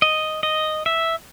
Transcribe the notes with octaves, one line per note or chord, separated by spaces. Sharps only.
D#5
D#5
E5